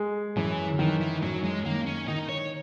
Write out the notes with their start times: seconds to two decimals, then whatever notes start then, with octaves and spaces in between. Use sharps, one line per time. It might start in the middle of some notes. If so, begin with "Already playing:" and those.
Already playing: G#3
0.37 F#2 E3
0.79 D#3 E3
1.01 E3
1.22 F#2 F#3
1.44 G#3
1.65 D#3 A#3
1.86 C#4
2.08 D#3 D#4
2.29 C#5